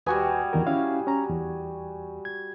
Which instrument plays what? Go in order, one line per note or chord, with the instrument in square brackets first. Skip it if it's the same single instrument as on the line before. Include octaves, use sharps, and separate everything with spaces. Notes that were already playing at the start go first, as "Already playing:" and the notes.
[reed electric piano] D#2 B4 G#5 [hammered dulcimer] G3 F#4 G#4
[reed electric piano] E2 D#3 A#4
C#4 E4 F5
C#4 A#5
E2
G#6